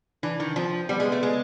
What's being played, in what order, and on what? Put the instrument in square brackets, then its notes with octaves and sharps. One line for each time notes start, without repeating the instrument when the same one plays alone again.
[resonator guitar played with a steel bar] E3 [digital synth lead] D4
[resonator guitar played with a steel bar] D#3
[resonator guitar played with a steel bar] F3 [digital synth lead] C4
[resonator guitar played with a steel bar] G3 [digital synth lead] B3
[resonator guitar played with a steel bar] G#3
A3
G#3